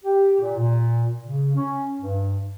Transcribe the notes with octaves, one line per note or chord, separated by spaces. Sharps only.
G4
A#2
A#2
C#3
C#4
G2